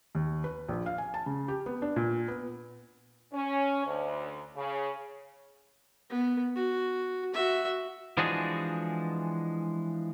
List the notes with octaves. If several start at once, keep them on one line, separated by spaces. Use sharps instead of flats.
D#2
B4
A#1
F5
G#5
A5
C#3
G4
B3
D4
A#2
B3
C#4
D2
C#3
B3
F#4
F#4 E5
E3 F3 G#3 D4 F#4 G#4